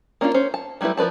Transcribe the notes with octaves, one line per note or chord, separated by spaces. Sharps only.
A#3 C#4 D4 E4 F4
C#4 C5
A5
F#3 G3 A3 E4 B4
F3 A#4 B4 D5 A5